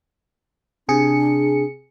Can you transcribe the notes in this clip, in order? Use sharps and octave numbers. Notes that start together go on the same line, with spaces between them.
C3 D4 G#4 C#7